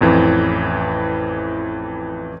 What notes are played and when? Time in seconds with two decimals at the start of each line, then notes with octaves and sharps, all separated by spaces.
0.01 A1 F2 E3